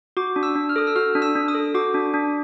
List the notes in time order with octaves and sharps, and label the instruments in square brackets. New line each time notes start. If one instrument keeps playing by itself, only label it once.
[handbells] F#4 D6
D4
E6
D4
F6
A4 D#6
E6
F#4 F6
D4
E6
D4
D#6
A4
F#4 D6
D4
D4